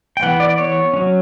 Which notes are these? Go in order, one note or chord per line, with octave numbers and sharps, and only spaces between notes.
G5
E3 B3 F#5
D5
C#5
F#3 C#4